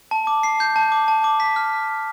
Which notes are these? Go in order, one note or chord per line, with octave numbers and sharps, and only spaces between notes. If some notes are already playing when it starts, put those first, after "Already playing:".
A5
D6
C7
G6
A5
D6
A5
D6
B6
F6